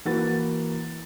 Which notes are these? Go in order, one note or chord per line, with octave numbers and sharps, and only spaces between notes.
E3 A#3 F#4 B4 A6